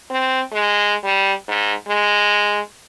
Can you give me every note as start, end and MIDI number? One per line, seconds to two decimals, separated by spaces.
0.11 0.42 60
0.52 0.95 56
1.04 1.33 55
1.48 1.73 44
1.88 2.60 56